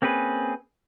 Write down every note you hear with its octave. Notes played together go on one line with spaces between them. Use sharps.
A#3 C4 C#4 G#4 B4